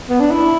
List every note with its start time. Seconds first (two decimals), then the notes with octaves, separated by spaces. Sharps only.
0.09 B3
0.20 D4
0.31 E4